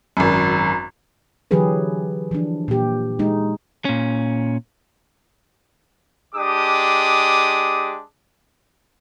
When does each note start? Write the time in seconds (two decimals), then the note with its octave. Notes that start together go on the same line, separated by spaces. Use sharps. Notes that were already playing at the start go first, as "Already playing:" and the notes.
0.17 G#1 F#2
1.51 D3 E3 F#3 G4 G#4 B4
2.31 E3 F3 D4
2.68 A#2 G4
3.19 G#3 D#4
3.85 A#2 C#4
6.35 G#3 D4 G4 D6 D#6